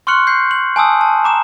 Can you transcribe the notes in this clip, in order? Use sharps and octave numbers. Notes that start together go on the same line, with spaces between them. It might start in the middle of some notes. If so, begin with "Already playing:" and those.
C6 C#6 F6 F#6 C#7 F#7
G6 C7
F#7
G#5 A5 D#6 E6
A5
A#5 D6 E7